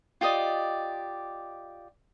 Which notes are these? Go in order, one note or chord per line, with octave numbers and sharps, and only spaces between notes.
F4 G4 D5 D#5